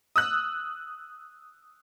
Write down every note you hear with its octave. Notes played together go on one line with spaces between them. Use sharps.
D#6 E6 F#6